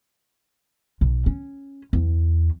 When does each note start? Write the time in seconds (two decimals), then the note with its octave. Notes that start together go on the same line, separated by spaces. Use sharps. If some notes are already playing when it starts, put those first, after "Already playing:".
1.01 B1
1.26 C#4
1.93 E2